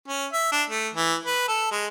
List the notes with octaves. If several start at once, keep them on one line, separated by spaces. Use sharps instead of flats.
C#4
E5
D4
A3
E3
B4
A4
G#3